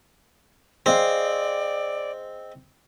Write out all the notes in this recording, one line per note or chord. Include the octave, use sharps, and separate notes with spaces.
C4 G#4 D5 D#5 F5